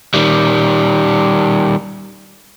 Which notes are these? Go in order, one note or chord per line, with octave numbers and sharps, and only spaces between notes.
D#3 G3